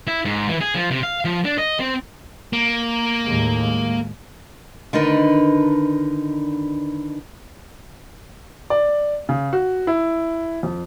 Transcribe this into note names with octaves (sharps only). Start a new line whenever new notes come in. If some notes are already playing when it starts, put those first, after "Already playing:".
E4
G#2
E3
G#4
F3
C3
F5
F3
D4
D#5
C4
A#3
D#2 A2 G#3
D3 D#3 D4 D#4 A#4 B4
D5
C#3
F#4
E4
F2